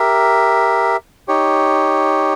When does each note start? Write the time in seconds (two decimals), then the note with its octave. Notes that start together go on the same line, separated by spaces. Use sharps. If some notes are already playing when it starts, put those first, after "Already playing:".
Already playing: G4 A#4 E5
1.28 D#4 G4 C#5